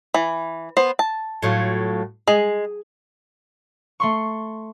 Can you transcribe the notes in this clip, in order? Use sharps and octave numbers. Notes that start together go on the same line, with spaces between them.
E3
B3 C5
A5
A2 F#3 F4
G#3 G#4
A3 C6 C#6